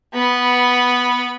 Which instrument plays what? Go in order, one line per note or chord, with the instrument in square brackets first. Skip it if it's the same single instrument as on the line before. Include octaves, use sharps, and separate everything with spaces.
[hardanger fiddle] B3 B5